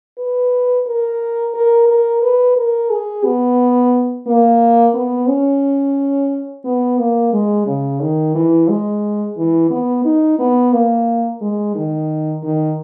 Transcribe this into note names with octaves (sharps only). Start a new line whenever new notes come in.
B4
A#4
A#4
A#4
B4
A#4
G#4
B3
A#3
B3
C#4
B3
A#3
G#3
C#3
D#3
E3
G#3
E3
B3
D#4
B3
A#3
G#3
D#3
D#3